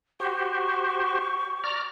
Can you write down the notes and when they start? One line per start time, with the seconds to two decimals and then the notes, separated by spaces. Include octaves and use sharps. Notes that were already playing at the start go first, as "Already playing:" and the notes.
0.20 F#4 G4 C5 C#6
1.64 D5 A#5 F6